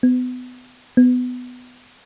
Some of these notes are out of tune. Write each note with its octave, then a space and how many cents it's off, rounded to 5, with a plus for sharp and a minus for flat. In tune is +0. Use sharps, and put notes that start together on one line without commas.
B3 +30
B3 +15